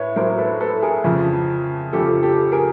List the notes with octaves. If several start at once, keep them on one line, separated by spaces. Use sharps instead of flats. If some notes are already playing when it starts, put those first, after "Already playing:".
Already playing: A2 B4 C#5
A2 F#3 A#4 C5
A4 B4
A4 B4
G#4 A#4
F2 C#3 F3
F2 C#3 F3 G4 A4
G4 A4
G#4 A#4